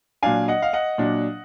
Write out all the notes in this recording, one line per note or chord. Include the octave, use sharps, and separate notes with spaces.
A#2 F#3 D4 F5 G#5
D#5 F#5
F5
D#5 F#5
A#2 F#3 D4